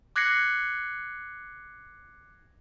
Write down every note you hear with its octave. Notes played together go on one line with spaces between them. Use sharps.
D6 F#6 G#6 A#6 C7 C#7